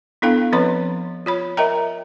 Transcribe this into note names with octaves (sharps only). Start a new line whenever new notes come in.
B3 D4 E4 A4 F5 G5
F3 C4 B4 C#5 B5 C6
F4 C#5 B5
A#4 D#5 E5 G5 A#5